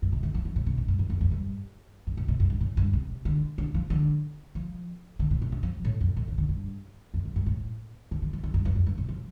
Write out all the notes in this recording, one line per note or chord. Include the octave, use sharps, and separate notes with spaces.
G2
C3
D3
F3
D3
A2
C3
A2
G2
G2
F2
F2
G2
G2
A2
C3
G2
G2
A2
G2
C3
D3
D3
F3
D3
F3
D3
A2
C3
D3
F3
A2
F2
A2
D3
D3
G2
F2
F2
G2
A2
D3
D3
F3
D3
G2
G2
F2
G2
C3
F3